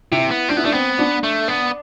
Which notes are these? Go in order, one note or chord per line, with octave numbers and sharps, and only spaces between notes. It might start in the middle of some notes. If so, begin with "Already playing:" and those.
C3 E4
B3
C4 D4
B3 E4
A3 D4
B3 C4
D4
A3
B3